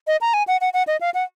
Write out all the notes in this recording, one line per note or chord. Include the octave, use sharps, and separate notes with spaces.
D#5
A#5
G#5
F#5
F#5
F#5
D#5
F5
F#5